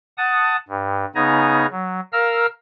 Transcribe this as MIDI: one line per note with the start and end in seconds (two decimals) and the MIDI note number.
0.18 0.56 78
0.18 0.56 81
0.18 0.56 87
0.69 1.05 43
1.15 1.66 49
1.15 1.66 59
1.15 1.66 63
1.15 1.66 80
1.15 1.66 82
1.71 2.00 54
2.13 2.46 70
2.13 2.46 77
2.13 2.46 82
2.13 2.46 88
2.13 2.46 89